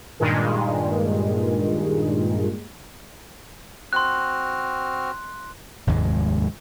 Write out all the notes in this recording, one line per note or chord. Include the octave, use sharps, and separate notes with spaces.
G2 A#2 D#3 G#3
C4 F#4 C6 F6 F#6
F1 D#2 G#2 G#3